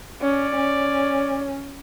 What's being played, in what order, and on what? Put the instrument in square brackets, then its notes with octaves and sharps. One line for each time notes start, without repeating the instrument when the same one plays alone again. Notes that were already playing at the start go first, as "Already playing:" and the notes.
[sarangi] C#4 [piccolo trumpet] D5
[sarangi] C#4